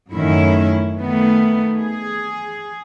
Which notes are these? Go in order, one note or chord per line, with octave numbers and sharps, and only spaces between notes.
F#2 A2 D#3 F#3 C#4 E4
D#3 A3 B3
G#4